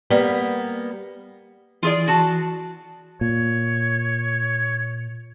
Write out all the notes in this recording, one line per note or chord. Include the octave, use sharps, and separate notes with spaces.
G3 A#3 B3
E3 F4 G#4 D5
F#4 A5
A#2 C#5